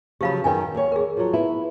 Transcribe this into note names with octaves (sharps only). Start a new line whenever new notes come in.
C#3 F3 F#3 G4 F5 B5
F#2 D#3 B4 G5 G#5
D#2 C#5
G#4 A#4
F3 F#3
B3 E4